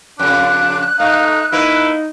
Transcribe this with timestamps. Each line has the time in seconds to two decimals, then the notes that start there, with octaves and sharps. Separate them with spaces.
0.19 F2 C#3 D4 F#6
1.00 A3 D#4 F5
1.52 A#3 D#4 E4 A#4 B4